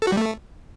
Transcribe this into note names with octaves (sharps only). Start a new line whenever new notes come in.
A4
F#4
G3
A3